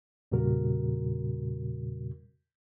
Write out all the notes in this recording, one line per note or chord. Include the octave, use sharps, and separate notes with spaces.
E2 A#2 C#3 G3 F#4 A#4